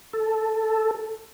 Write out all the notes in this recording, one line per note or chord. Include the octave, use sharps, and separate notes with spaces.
A4